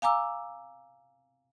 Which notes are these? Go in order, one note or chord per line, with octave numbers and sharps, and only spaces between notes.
F5 G#5 A#5 D6 E6